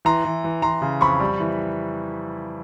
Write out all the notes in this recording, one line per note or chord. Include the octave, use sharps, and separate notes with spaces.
E3 A#5 C6
E3
E3
E3 A#5 C6
C#3
F2 B5 C#6
G3
E3